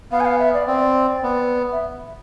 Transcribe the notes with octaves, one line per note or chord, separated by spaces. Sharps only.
B3 F5
G#5
F5
E5
D5
C4 D5
B3
E5